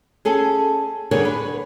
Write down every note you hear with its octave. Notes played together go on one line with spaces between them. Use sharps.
C#4 G#4 A4
D3 G3 G#4 A#4 C#5
B4